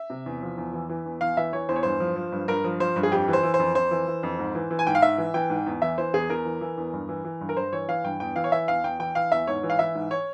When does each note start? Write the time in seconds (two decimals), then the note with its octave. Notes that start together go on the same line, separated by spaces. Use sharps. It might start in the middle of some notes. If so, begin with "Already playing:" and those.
Already playing: E5
0.10 C3
0.26 E2
0.42 F3
0.57 E2
0.74 E3
0.89 E3
1.06 E2
1.21 E2 F5
1.37 E3 E5
1.53 E3 C#5
1.69 E2 C5
1.76 C#5
1.83 G2 C5
2.00 F3
2.16 F3
2.32 G2
2.48 G2 A#4
2.64 F3
2.80 F3 C5
2.96 G2
3.03 G#4
3.11 F2 G4
3.28 E3
3.33 C5
3.43 E3
3.54 C5
3.59 F2
3.75 F2 C5
3.91 E3
4.07 E3
4.23 F2
4.39 G#2
4.55 E3
4.71 E3
4.79 G#5
4.87 G#2 G5
4.95 F5
5.02 G#2 E5
5.18 E3
5.34 E3 G5
5.50 G#2
5.66 E2
5.82 E3 E5
5.98 E3 C5
6.13 E2 G#4
6.30 E2 A#4
6.45 E3
6.61 E3
6.77 E2
6.93 G2
7.09 E3
7.25 E3
7.41 G2
7.49 A#4
7.57 G2 C5
7.72 E3 C#5
7.88 E3 F5
8.04 G2 G5
8.20 E2 G5
8.36 E3 F5
8.44 C#5
8.52 E3 E5
8.68 E2 F5
8.84 E2 G5
8.99 E3 G5
9.15 E3 F5
9.32 E2 E5
9.47 G#2 C#5
9.63 E3
9.70 F5
9.79 E3 E5
9.95 G#2
10.11 C#5